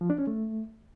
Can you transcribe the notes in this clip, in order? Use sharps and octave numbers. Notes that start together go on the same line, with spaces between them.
F3
D4
C#4
A3